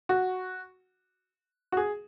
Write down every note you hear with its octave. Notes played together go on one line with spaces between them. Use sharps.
F#4
F#4
G#4